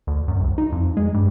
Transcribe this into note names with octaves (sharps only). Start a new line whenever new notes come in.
D2
F#2
C2
D#4
F2
G#3
G2